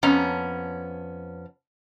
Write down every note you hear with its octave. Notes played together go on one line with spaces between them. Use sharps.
F2 B3 C#4 A#5